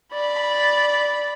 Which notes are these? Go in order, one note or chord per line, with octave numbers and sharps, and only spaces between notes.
D5 B5